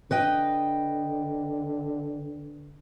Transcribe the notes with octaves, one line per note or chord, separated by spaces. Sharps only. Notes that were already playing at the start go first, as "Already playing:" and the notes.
D3 B4 D#5 G5